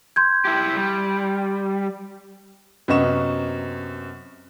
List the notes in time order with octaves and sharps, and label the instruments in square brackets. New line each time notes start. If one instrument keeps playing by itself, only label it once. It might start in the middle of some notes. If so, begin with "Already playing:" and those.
[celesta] C6 G6 G#6
[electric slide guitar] E4 G4
G3
[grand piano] F#2 C3 B3 D#5 C#6 E7